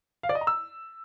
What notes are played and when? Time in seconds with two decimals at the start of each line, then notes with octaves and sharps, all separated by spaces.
0.23 F5
0.29 D5
0.35 D#5
0.41 A#5
0.47 E6